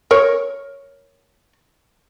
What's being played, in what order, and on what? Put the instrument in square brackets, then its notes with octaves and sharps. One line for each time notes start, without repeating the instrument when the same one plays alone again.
[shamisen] A#4 C#5